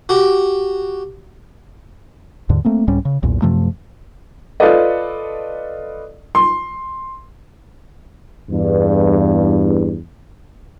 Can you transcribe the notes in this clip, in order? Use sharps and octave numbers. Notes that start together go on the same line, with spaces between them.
F#4 G4
D#2 G#2 D3
A3 A#3 C4
C2 G#2 G3 C#4
C#3
B1 E2 A#2
F#2 C3 F3 A3
F4 A4 B4 D5 D#5
C6
E2 G2